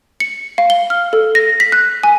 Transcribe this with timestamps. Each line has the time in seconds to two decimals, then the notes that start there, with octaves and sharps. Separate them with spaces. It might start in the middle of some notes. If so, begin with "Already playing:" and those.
0.20 C#7
0.58 F5
0.70 G7
0.90 F6
1.13 A4
1.35 A#6
1.60 B6
1.72 F#6
2.03 G#5